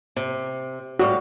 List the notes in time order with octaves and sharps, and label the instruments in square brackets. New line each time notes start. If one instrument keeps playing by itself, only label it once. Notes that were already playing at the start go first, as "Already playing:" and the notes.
[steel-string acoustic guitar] C3
[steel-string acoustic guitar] A2 G3 F5 [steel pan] F#4